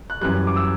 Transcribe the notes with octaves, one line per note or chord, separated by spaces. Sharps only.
F#6
F#2 E3 G3 F#6
D6
E6